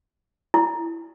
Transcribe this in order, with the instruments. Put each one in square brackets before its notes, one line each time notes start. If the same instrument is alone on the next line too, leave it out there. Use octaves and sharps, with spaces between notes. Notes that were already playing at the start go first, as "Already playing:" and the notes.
[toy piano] E4